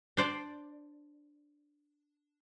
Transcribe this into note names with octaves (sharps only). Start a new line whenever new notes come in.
D4 C5 D5